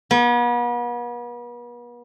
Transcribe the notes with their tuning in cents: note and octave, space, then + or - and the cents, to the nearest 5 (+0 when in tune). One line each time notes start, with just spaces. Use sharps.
B3 -40